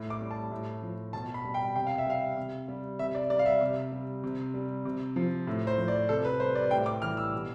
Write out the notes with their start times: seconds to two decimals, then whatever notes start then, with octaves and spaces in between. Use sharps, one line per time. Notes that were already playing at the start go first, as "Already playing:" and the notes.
Already playing: A2
0.10 D6
0.21 G3
0.31 A5
0.51 A2
0.82 F3
1.13 B2 A5
1.34 B5
1.45 G3
1.54 G5
1.75 C3 G5
1.87 F5
1.98 E5
2.07 G3 F5
2.37 C3
2.68 G3
2.99 C3 E5
3.15 D5
3.30 G3 D5
3.39 F5
3.46 E5
3.61 C3
3.92 G3
4.24 C3
4.54 G3
4.85 C3
5.16 F3
5.47 A2
5.67 C5
5.78 F3
5.88 D5
6.09 C3 A4
6.25 B4
6.40 G3 C5
6.55 D5
6.71 A2 G5
6.86 D6
7.02 E3 G3 F6
7.17 E6
7.33 B2